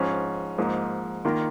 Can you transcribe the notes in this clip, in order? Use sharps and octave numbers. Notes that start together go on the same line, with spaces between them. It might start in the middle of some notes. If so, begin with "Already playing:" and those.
Already playing: G#2 F3 C#4
G#2 F3 A#3 D#4
D#3 A#3 F4 A#4